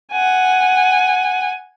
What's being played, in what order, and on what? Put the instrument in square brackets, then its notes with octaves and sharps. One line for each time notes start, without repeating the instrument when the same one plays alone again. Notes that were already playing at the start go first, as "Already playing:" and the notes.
[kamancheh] F#5 G#5